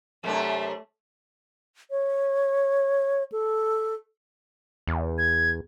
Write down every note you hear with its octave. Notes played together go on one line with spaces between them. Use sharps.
F#2 C3 A3 D4
C#5
A4
E2
G#6